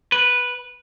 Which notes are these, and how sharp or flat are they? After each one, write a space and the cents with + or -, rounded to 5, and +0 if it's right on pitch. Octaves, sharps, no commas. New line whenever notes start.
B4 -5